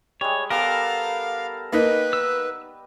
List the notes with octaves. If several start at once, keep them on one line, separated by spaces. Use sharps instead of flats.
G3 G#3 C#5
B3 G4 A4 A#4 F5
A#3 D#4 B4 D#5
E6